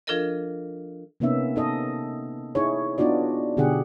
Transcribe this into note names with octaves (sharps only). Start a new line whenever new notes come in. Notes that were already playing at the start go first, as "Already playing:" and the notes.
F3 D4 F4 A4 A#4 D#5
C3 A#3 B3 C#4 D#4 E5
D#4 A4 D#5
D#4 E4 G#4 C#5
B3 D4 D#4 F4 F#4 D5
B2 D3 G4 G#4 F#5